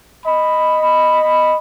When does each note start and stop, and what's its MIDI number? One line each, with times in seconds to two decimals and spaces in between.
0.26 1.56 75
0.26 1.56 83